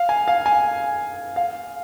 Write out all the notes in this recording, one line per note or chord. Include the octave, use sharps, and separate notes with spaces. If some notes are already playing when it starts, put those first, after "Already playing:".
Already playing: F5
G#5
F5
G#5
F5